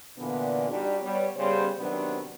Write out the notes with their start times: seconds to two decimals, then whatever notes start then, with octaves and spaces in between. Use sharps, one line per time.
0.17 A#2 D3 E3 B3
0.68 G3 D4 D#4 F#4 G4
1.01 G3 B3 C#5
1.36 C#3 G3 B3 C#4 C5
1.77 C3 D#3 F#3 B3 C4 D4